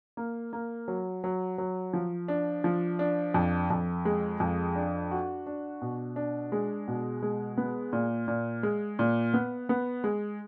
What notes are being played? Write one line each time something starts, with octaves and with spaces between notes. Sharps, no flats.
A#3
A#3
F#3
F#3
F#3
F3
D4
F3
D4
F2
F2
G#3
F2
D4
F#4
D4
B2
D4
G#3
B2
G#3
B3
A#2
A#2
G#3
A#2
B3
B3
G#3